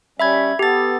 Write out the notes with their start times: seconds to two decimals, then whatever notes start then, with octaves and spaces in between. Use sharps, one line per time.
0.20 G3 C#4 E5 B5 G#6
0.59 B3 G4 A4 A6